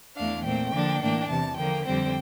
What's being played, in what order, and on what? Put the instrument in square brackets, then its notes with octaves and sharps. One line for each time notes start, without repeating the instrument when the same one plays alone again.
[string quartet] E2 E3 A3 D4 F5
A#2 A3 C4 G5
D3 F3 A#3 D4
A2 E3 A#3 D4
E2 C3 E3 A5
D3 F3 A#3 G5
F2 D3 G3 C4 G5